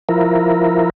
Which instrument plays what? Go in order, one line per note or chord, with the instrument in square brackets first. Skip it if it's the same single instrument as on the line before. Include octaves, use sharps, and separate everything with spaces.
[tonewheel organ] F3 E4 A#4